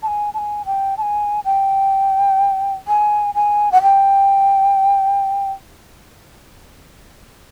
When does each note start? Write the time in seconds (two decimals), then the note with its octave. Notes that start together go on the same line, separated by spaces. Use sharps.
0.03 A5
0.07 G#5
0.34 A5
0.38 G#5
0.66 G5
0.97 A5
1.02 G#5
1.45 G5
2.88 G#5
3.35 G#5
3.72 F#5
3.82 G5